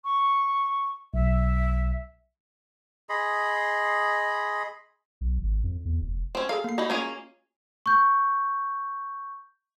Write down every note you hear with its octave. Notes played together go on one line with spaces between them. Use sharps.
C#6
B1 E5
G#4 D#5 B5 C6
B1
G#1
F2
E2
F1
C4 C#4
G#4 A4 F5 A#5
A#3 C7
D#4 E4 F#4 D#5 B5
A#3 C#4 F4 G#4 C#5
C#6 G6